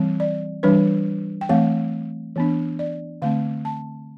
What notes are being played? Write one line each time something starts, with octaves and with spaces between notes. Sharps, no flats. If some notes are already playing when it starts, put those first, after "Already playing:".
Already playing: E3 G3 C4
D5
E3 G3 D4 B4
G5
E3 A3 C4 F5
E3 B3 D4
D5
D3 A3 C4 F5
A5